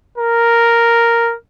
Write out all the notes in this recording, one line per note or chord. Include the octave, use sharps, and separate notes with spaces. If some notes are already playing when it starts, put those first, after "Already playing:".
A#4